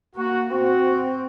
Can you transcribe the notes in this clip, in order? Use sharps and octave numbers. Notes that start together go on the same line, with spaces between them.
A#3 F#4
C4 F#4